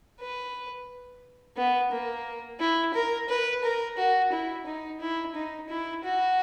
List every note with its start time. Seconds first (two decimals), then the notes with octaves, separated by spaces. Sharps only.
0.20 B4
1.57 B3
1.92 A#3
2.60 E4
2.94 A#4
3.29 B4
3.63 A#4
3.98 F#4
4.32 E4
4.66 D#4
5.01 E4
5.35 D#4
5.69 E4
6.04 F#4